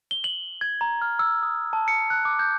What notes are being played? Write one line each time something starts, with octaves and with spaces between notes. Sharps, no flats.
G7
F#7
G#6
A#5
F6
E6
D#6
A5
C#7
F#6
D6
G6